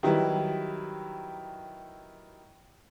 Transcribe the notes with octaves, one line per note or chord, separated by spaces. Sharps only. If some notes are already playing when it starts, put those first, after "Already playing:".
D#3 F#3 G3 E4 B4